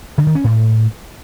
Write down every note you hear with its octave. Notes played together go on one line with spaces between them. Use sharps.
D3
D#3
C#4
A2